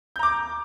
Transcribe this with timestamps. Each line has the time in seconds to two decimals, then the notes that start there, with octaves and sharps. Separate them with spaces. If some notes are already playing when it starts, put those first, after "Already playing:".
0.16 G6
0.19 A#5
0.23 D6